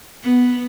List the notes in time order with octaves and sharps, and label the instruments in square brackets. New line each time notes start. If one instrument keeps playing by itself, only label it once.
[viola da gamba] B3